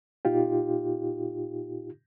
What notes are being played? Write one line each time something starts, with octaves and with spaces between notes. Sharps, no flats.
A#2 D#4 F4 G4